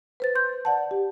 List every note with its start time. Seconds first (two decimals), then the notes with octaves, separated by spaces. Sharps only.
0.20 B4 C5 A6
0.35 C6 G6
0.65 D5 F#5 A5
0.91 G4